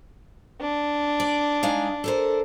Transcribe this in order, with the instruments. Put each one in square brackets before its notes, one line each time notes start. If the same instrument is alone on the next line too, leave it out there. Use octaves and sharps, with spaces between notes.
[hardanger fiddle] D4
[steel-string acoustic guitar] D5
G#3 D#4 F5
A4 A#4 C5